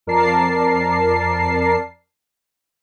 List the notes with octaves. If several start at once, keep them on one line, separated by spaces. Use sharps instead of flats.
F2 A#4 D5 A5 C7